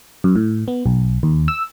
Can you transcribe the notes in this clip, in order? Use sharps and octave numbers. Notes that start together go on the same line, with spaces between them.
F#2
A2
B3
B1
D#2
E6